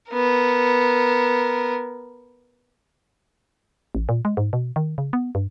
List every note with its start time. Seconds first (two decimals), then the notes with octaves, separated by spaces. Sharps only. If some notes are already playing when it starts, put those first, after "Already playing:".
0.12 B3 A#4
3.95 A1
4.09 A#2
4.25 G#3
4.37 G#2
4.53 B2
4.76 D#3
4.98 C#3
5.13 B3
5.35 G2